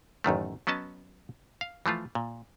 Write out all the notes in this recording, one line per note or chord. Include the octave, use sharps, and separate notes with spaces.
A1 F#2 D#3 A3
F#3 B3 C#4 D#5 A5
F5
E3 F3 A3 F4
A#2